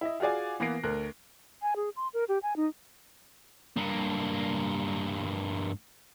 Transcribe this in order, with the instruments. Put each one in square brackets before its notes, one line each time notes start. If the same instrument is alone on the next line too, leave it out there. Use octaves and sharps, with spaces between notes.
[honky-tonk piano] E4 D#5
F4 F#4 G#4 D5 G#5
E3 A#3 B3 A#6 C7 D7
D2 A#4 F#6
[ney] G#5
G#4
C6
A#4
G4
G#5
D#4
[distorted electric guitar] G2 A#3